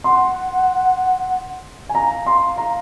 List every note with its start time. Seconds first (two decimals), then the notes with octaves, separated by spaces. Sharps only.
0.04 F#5 C6
1.89 G#5
1.94 F5 A#5
2.26 C6
2.58 A#5